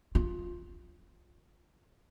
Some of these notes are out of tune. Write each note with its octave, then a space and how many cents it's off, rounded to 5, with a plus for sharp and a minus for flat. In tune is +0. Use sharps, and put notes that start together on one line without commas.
F4 +5